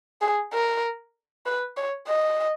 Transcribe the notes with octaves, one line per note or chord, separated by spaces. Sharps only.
G#4
A#4
B4
C#5
D#5